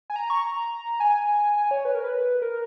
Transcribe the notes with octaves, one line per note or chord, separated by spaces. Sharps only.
G#5
A#5
C#6
A#5
G#5
G#5
C#5
B4
A#4
B4
A#4